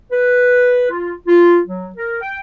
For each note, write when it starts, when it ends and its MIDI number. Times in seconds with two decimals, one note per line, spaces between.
0.12 0.86 71
0.90 1.13 65
1.27 1.59 65
1.67 1.90 54
1.96 2.20 70
2.22 2.39 79